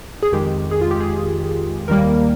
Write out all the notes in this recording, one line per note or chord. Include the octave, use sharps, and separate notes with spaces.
G#4
F2 D#3 G#3 G4
G#4
F4
G4
G#4
D#2 D#3 G3 A#3 A#4